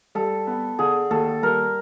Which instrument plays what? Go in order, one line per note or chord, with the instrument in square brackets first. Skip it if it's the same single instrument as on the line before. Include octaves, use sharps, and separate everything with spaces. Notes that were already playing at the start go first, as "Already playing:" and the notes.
[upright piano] G3 [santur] A4
[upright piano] B3
[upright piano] D3 [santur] G#4
[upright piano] D#2 [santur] A4
[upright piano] G3 [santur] A#4